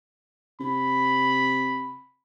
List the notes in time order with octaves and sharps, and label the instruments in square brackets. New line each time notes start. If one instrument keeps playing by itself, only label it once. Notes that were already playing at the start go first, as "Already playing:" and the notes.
[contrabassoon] C3 [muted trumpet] B5